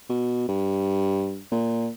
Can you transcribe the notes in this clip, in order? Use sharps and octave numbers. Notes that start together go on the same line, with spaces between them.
B2
G2
A#2